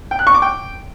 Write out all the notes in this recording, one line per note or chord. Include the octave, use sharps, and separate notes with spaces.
G5
F#6
C#6
D6
G5